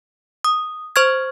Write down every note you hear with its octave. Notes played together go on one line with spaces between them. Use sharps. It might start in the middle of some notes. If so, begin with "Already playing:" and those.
D#6
C5 C#6 F6 G#6